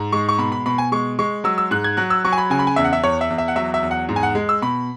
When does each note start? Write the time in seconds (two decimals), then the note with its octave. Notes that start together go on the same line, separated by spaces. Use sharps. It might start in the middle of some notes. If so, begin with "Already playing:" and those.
Already playing: G#2
0.12 G#3 C#6
0.29 C#6
0.38 B2 B5
0.52 B5
0.66 B2 B5
0.78 G#5
0.92 G#3 C#6
1.19 G#3 C#6
1.44 F#3 E6
1.58 E6
1.71 G#2 F#6
1.84 G#6
1.97 F#3 F#6
2.10 E6
2.25 F#3 C#6
2.32 G#5
2.38 B5
2.50 C#3 G#5
2.59 B5
2.67 G#5
2.76 E2 E5
2.84 F#5
2.93 E5
3.03 E2 C#5
3.21 E5
3.30 E2
3.38 E5
3.48 F#5
3.56 F#3 E5
3.74 E5
3.83 E2
3.91 F#5
4.09 G#2
4.16 G#5
4.23 F#5
4.35 G#3
4.49 E6
4.62 B2 B5